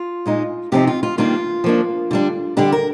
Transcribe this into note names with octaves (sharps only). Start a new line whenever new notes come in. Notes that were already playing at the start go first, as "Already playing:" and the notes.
Already playing: F4
A#2 G#3 D#4
C3 F3 C4 D#4 G4
F4
F4
D#3 G3 A#3 D4 F4
F3 A#3 D4
D3 G3 D4
D3 G3 D4 G4
A#4